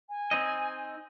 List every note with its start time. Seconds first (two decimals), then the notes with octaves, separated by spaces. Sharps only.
0.09 G#5
0.31 C4 D#4 D#5